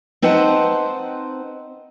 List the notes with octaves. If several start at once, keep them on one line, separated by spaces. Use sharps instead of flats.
C4 D#4 B4 C5 F#5 A5